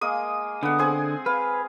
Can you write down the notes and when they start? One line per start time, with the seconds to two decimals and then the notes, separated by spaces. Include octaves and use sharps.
0.01 G#3 A#3 D#6
0.63 D3 B3 F#5
0.79 C4 G#4 G#5
1.26 B4 F5